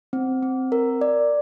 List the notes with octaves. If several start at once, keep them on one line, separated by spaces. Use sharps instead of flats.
C4
C4
A#4
D5